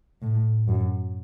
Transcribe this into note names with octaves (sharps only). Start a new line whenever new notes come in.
A2
F#2